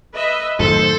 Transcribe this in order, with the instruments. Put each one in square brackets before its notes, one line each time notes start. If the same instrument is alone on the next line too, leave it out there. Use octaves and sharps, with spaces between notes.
[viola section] B4 D#5 E5
[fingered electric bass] F#2 A2 D#3 [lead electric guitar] A4 [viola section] C5